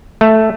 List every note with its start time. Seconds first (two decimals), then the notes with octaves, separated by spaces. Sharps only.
0.21 A3